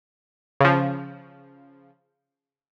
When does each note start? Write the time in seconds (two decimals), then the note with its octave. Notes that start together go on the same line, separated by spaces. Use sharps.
0.61 C#3 F3